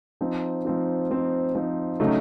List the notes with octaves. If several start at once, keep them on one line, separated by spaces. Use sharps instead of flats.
F3 C4 D#4
F3 C4 D#4
F3 C4 D#4
F3 C4 D#4
C#3 F#3 A3 D#4